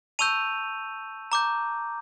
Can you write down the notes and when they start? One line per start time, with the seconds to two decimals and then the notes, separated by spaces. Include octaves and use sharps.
0.19 A5 C#6 E6 G6 D#7 F7
1.32 A#5 D6 G6